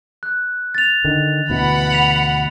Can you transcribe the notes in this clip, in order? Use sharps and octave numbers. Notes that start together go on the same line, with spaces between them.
F#6
A6 F7
D3 D#3
D2 B2 E3 F#5 B5
B6 F7